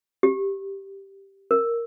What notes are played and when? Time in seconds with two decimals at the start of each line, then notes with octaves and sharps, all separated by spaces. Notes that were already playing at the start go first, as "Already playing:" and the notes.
0.23 G4
1.51 A#4